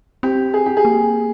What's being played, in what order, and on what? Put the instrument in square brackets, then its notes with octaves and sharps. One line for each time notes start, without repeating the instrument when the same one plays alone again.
[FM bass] C4 [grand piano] G4
[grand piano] G#4
G4
G#4
[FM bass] A#3